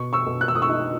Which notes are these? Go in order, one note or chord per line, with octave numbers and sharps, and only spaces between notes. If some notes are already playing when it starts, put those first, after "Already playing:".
Already playing: B2 C#6
C#6 E6
B2
F#6
E6
D#6
C#6 E6
D#4